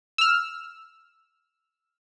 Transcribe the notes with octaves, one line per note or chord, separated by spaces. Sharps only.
E6 F6